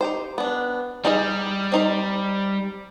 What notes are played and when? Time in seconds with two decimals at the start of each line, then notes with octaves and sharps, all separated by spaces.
0.01 D#4 G4 C5
0.38 B3 D4
1.05 G3 D#4 G#4 D#5
1.72 C4 D#4 C5